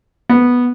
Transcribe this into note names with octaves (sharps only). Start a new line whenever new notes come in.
B3